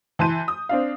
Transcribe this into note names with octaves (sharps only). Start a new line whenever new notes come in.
E3 A5 C6 G6 D#7
D#6
C4 D4 F5